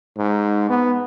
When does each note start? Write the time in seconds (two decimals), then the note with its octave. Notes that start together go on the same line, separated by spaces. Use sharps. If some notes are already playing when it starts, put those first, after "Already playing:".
0.17 G#2
0.69 B3